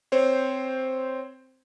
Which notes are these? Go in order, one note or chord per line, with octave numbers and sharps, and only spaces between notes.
C4 C5 C#5